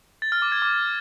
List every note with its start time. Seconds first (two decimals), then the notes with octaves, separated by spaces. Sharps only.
0.22 A6
0.32 F6
0.42 D6
0.52 G#6
0.62 D6